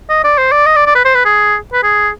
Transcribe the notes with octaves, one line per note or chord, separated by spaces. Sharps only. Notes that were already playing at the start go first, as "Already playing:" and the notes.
D#5
D5
C5
D5
D#5
D5
D5
B4
C5
B4
G#4
B4
G#4